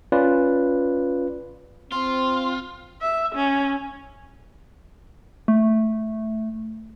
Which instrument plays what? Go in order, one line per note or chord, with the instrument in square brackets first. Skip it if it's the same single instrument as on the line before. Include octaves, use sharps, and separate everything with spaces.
[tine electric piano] C#4 F4 B4 D5
[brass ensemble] C4 [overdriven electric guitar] F4 [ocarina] C6
[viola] E5
C#4
[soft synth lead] A3